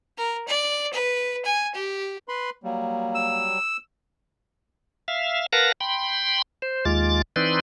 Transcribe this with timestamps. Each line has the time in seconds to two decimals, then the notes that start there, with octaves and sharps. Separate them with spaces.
0.18 A#4
0.48 D5
0.93 B4
1.45 G#5
1.74 G4
2.29 B4 B5 C6
2.64 F#3 G3 A#3
3.15 E6
5.08 E5 F5
5.53 A#4 B4 F5 F#5 A5 A#6
5.81 G5 B5 C6
6.62 C5
6.85 D#2 G#3 F4 D6 A6
7.36 E3 C4 D#4 B4 D5 C6